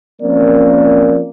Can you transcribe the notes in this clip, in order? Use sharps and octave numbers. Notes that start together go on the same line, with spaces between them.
F3 A#3 C4 C#4 A#4 D5